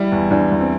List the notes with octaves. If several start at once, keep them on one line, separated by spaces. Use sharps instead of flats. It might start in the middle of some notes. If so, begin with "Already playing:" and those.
Already playing: G3 E4
E2
E2 D4
E2
C4